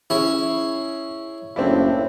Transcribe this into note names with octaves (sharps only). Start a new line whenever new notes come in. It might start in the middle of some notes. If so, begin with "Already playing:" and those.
C#4 E4 G#4 C#5
F#1 A2 C#3 C4 D4 E4